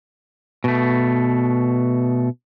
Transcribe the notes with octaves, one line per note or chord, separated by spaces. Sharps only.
B2 A3